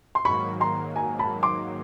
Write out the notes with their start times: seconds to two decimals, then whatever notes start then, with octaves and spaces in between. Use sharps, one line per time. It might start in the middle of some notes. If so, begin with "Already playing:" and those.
0.15 C6
0.25 G#2 D#3 F#3 A#3 B5 C#6
0.60 A#5 C6
0.96 G#5 A#5
1.19 A5 B5
1.43 C6 D6